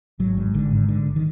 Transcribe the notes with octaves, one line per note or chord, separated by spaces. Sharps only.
G#1 F#3
G#2
G#1 D3
G#2
D3
G1
D#3